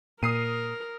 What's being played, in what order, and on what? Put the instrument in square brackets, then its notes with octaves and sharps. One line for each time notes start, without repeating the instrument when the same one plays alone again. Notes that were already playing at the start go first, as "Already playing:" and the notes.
[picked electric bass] A#2 [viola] A#4 [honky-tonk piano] D#6 C7 D#7